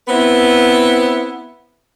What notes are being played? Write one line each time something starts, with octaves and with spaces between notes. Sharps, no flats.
B3 C4 E4 B4